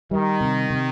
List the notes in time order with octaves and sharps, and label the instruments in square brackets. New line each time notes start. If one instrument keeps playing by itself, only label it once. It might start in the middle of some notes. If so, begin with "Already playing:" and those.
[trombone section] D#3 [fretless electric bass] G3
[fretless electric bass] C3
C3